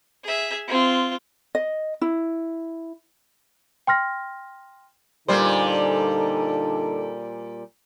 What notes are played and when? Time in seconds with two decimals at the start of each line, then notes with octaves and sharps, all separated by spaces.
0.23 G#4 E5
0.67 C4 F4
1.55 D#5
2.01 E4
3.87 G5 C6 F6 A#6
5.28 A#2 D3 G3 D#4 A4 C5